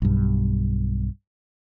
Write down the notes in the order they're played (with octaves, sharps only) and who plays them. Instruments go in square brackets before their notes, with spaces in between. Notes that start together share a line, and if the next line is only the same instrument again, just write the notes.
[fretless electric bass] B1 G2